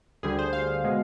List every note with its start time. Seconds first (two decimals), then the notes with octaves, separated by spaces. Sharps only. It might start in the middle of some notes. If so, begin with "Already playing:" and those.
0.23 D2 D3 G3 G#4
0.39 C5
0.53 F5
0.84 B2 G#3